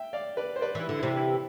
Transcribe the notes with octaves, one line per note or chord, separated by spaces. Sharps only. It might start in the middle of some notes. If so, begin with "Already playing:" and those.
Already playing: E5 G5
D5 F5
B4 D5
C5
B4 D5
E3 E4
D3
C3 E3 E4
E4